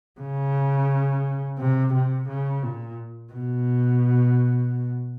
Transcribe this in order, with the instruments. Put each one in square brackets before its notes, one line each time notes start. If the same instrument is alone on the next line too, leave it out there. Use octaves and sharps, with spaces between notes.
[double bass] C#3
C3
C3
C#3
A#2
B2